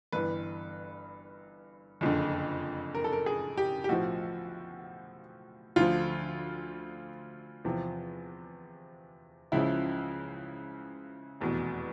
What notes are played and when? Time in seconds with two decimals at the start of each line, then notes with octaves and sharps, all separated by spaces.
0.12 G1 G2 E3 B4
2.01 F#1 F2 D3
2.95 A#4
3.04 A4
3.13 A#4
3.26 G#4
3.57 G4
3.84 G4
3.89 B1 A2 F3 F#4
5.76 D2 D3 F3 F4
7.65 E2 C3 F3
9.52 C#2 C#3 F3 E4
11.41 F1 E2 B2